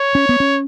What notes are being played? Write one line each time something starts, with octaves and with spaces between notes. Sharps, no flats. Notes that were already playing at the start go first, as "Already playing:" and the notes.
Already playing: C#5
C#4
B3
C#4